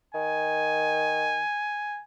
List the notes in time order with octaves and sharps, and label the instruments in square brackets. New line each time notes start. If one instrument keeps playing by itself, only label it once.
[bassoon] D#3 [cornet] G#5